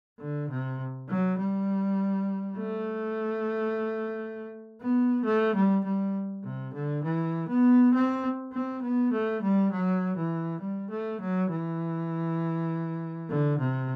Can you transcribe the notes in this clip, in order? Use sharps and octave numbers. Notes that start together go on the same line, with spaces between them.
D3
C3
F#3
G3
A3
B3
A3
G3
G3
C3
D3
E3
B3
C4
C4
B3
A3
G3
F#3
E3
G3
A3
F#3
E3
D3
C3